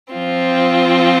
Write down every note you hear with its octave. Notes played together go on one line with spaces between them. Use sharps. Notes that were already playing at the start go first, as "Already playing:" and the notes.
F3 C4 F4